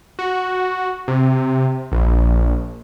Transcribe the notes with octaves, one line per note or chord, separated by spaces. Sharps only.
F#4
C3
A#1